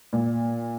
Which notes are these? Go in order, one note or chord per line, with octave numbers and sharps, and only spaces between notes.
A#2